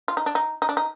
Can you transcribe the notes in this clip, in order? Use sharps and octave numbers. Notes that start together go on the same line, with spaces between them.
F4
D#4
D4
D#4
D#4
D4
D#4